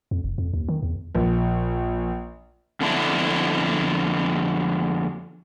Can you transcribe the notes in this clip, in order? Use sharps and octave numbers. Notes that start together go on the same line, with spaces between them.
F2
F1
F2
D#2
D#3
E2
A#1
F2 D3 B3 D4 E4